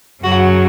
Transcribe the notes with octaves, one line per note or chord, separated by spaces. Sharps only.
F#2 C#3 F#3 F#4